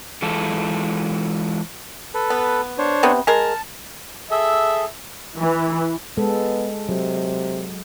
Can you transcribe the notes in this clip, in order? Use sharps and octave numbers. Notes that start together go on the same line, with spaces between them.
E3 G#3 F4 A4
A4 B4
B3
D4 C5 C#5
C3 B3
G#3 A#4 A5
G#4 A4 E5
E3
G#3 B3 A4
C3 F#3